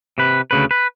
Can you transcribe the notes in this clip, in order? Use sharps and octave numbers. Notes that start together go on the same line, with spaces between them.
C3 B4
D2 C#3 B4
B4